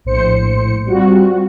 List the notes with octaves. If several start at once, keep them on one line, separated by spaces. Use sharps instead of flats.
A#1 A2 C5 C#7
G3 C4 F4 F#4